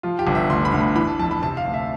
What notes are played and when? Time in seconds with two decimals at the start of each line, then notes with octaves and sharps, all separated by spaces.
0.03 F3 F4
0.19 G4
0.27 G1
0.35 E5
0.50 D2 C6
0.65 B5
0.72 D2
0.81 B5
0.95 E3 B5
1.07 A5
1.19 F2 A5
1.31 B5
1.42 C3 A5
1.57 F5
1.65 D2
1.74 E5